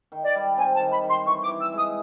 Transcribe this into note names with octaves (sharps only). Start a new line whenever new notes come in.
D#3
D5
G3
C4 G#5
A5
D#3
B5
D#3 C6
E3 C#6
D6
E3
E6
G#3
D#6